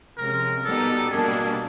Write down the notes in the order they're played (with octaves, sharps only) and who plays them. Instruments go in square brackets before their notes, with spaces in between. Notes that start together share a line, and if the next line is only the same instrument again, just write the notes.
[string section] C3 F3 G#3 C#4 [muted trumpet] A#4
[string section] B2 G3 B3 D#4 G4 [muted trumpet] A4
[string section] B2 G3 A#3 D4 [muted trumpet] G#4